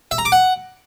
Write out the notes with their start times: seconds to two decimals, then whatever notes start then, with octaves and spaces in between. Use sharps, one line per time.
0.11 E5
0.18 A#5
0.25 D6
0.32 F#5